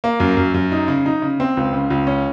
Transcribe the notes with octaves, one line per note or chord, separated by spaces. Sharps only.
A#3
F#2
F#2
F#2
D#4
C#3
D#4
C#3
C4
C#2
C#3
C#2
C#4